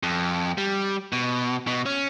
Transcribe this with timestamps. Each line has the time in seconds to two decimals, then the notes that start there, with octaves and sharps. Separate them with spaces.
0.03 F2
0.58 G3
1.13 B2
1.68 B2
1.86 C#4